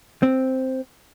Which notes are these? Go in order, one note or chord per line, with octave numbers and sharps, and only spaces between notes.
C4